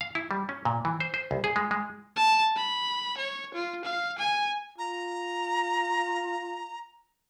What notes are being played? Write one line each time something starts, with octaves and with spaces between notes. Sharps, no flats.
F5
E4
G3
C#4
A#2
E3
C5
C5
C2
G#4
G#3
G#3
A5
B5
C#5
F4
F5
G#5
F4 A#5